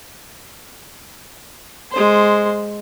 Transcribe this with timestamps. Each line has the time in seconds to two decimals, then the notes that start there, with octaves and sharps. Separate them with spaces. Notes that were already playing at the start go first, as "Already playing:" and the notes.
1.92 G#3 C5